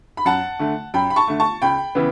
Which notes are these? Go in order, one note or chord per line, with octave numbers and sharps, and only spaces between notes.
B5
F#2 F#5 A5
D3 A3
F#2 G5 B5
B5
A5 C#6
D3 A3
A5 C#6
C#2 G5 B5
C#3 E3 B3